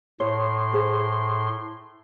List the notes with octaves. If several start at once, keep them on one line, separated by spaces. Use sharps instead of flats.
A2 C#5 C6
G#4 C5